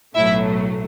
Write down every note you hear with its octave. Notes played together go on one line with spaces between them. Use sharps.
B1 A2 F#3 A3 E4 E5